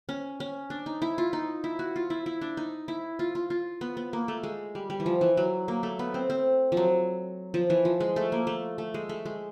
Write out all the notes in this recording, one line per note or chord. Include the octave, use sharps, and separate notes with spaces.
C#4
C#4
D4
D#4
E4
F4
D#4
E4
F#4
F4
E4
E4
D4
D#4
E4
F4
F4
F4
B3
B3
A#3
A3
G#3
G3
G3
E3
F3
E3
F#3
A#3
A3
B3
C4
C4
F3
F#3
F3
E3
F3
G#3
A3
A#3
A3
A3
G#3
A3
G#3